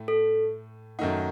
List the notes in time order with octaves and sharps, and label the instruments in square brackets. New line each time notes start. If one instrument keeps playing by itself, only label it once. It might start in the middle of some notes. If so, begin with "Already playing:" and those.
Already playing: [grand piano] A2 A3
[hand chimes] A4
[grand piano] F#2 D#3 A3 D#4 [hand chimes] F#5